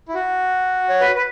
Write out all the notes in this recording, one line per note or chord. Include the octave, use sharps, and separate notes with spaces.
E4
F#4
C#5
B4
B4